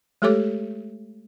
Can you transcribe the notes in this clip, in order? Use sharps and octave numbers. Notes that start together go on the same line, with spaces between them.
G#3 A3 G4 A4 C#5 D6